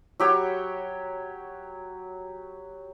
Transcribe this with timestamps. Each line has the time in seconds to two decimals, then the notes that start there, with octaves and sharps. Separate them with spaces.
0.20 F#3 G4 C#5